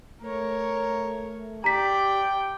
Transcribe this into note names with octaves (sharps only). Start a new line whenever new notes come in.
A3 A#4 C#5
G4 D5 G5 A#5 B6